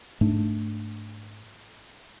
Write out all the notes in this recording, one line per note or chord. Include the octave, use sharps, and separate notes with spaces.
G#2 A3 D4